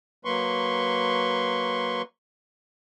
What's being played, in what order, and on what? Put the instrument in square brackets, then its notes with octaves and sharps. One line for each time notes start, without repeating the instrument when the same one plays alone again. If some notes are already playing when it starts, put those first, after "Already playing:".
[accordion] F#3 A#3 B4 C6 C#6